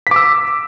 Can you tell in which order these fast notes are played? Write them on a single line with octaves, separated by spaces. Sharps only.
B6 D6 E6